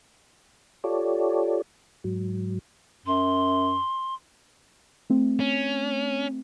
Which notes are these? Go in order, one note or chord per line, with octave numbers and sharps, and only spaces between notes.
F4 G4 A4 C#5 D5
G#2 F#3
F#2 C6
A3 C4
C#4